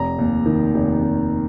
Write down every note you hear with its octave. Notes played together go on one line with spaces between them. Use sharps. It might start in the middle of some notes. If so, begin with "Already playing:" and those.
Already playing: F1 A#5
D#2
D#3
F1
F1